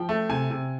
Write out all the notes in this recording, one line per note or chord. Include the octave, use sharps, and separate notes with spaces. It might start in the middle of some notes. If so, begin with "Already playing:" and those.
Already playing: F3 G5
A3
C3 G#5
C3